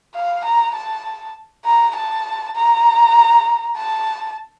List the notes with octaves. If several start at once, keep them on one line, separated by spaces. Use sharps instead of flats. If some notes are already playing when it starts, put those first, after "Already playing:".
F5
A#5
A5
A#5
A5
A#5
A5